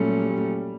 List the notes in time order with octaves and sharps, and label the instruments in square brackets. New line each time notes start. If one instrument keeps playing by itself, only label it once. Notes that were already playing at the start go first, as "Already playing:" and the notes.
Already playing: [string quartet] A#2 F#3 A3 C#4 [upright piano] G3